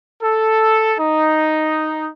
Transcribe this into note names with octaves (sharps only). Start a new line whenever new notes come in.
A4
D#4